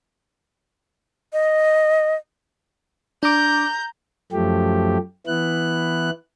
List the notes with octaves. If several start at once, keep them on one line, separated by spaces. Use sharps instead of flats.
D#5
D4 A#5 D6 G6
F#2 F3 A3 G4
E3 B3 E4 F#6